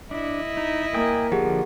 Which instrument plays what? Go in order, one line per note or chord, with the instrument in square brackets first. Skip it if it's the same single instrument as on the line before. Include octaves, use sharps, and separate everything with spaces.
[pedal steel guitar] D4 [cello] E4 D#5
[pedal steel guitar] D#4
[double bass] A#3 [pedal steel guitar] G5 G#5 D#6
[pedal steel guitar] D3 F3 [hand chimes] G4 G#4 F#5